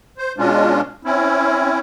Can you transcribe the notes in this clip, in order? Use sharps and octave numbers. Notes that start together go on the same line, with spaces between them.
C5
B2 G#3 C#4 D4 F4
C4 C#4 E4